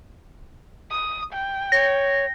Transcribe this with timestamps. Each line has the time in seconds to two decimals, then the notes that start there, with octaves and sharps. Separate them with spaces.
0.91 D#6
1.34 G5
1.72 C#5 A#6